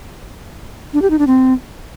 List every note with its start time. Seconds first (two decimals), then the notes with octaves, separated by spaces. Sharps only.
0.93 D4
1.02 G4
1.10 D#4
1.19 D4
1.27 C4